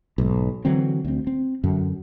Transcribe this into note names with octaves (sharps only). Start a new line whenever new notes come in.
B1 G#2
D3 E3 F#3 C4
D2 C4
C4
F#2 D3